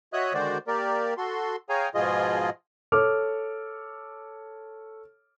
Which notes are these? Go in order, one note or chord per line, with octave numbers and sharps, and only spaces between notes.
F#4 C#5 D#5 E5 D#6 F#6
D3 D#3 G#3 F#4 C5 D5
A#3 G4 A#4 D5
F#4 A4 C6
G#4 C#5 F5 G5 G#5 A#5
G#2 B2 F3 F4 G#4 D#5
A4 C#5 D6 F6